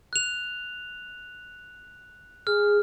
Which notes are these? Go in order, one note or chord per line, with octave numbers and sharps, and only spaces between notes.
F#6 F7
G#4 F6